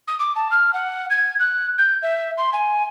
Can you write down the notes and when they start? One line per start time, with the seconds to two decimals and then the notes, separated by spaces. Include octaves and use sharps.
0.08 D#6
0.19 D6
0.36 A5
0.51 F6
0.74 F#5
1.10 G#6
1.40 F#6
1.78 G6
2.03 E5
2.38 C6
2.53 G#5